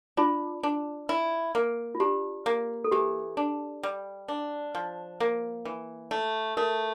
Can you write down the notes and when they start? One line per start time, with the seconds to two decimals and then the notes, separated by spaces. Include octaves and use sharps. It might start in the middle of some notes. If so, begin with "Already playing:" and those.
0.17 D4 F4
0.63 D4
1.09 E4
1.55 A#3
1.95 F4
2.00 D4 G4
2.46 A#3
2.84 A4
2.92 E3 G4
3.37 D4
3.83 G3
4.28 D4
4.75 F3
5.20 A#3
5.65 E3
6.11 A3
6.57 A3 A#4